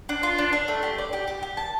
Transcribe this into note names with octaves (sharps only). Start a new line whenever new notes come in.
D4
F4
D4
D4
A3
G4
D5
G4
G4
G4
A5